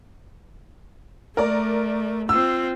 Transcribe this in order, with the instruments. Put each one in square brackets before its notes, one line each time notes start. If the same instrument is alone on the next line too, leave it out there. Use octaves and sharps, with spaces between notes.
[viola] A3 [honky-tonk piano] A#4 D5
[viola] C4 F4 [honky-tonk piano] E6